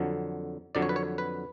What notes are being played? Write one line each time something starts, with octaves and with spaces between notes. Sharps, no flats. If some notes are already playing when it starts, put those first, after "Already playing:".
Already playing: F2 D3 F#3
F2 D3 F#3 D5
C#5
B4
C#5
B4